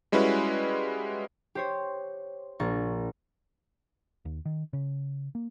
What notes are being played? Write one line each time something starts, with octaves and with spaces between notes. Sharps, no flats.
G3 G#3 C#4 E4 F#4 B4
G4 C5 C#5
A#1 A#4 C#6 A6
D#2
D#3
C#3
A#3